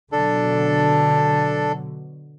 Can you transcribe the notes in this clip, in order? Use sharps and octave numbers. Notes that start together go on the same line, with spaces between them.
B2 D3 F#3 D4 A4